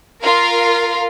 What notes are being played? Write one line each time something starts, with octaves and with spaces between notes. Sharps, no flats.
F4 A#4 F5